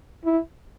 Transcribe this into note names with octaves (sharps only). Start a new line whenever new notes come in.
E4